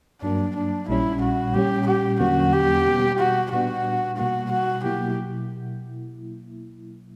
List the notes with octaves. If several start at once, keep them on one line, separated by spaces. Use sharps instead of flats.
G2 F#3 A#3 D4
D4
A#1 A#2 G3 C#4 E4
F#4
A#2 G3 C#4 G4
G4
E2 D3 F#3 A#3 C#4 F#4
G4
B2 G3 B3
F#4
A#2 G3 B3 D4 F#4
B2 G3 A#3 F#4
F#4
B2 F#3 A#3 E4 G4